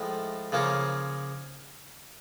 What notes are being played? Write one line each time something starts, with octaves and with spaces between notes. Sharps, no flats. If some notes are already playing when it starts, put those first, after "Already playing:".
Already playing: A2 F3 G#3
C#3 F3 A#3 C#4